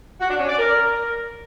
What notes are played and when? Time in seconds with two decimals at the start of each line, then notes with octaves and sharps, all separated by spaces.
0.21 F#4
0.30 D4
0.40 C#4
0.49 D5
0.58 A#4